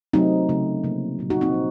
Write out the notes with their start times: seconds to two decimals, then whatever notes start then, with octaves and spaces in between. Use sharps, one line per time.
0.13 C3 F#3 A3 C4 D#4
0.49 C#3 A3
0.84 C3 F3 A#3
1.19 A#2 F#3 A3
1.30 D#4 F#4
1.41 C4 D#4
1.53 A#2 F3